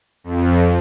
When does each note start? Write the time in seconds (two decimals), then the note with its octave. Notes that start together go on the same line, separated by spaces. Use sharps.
0.24 F2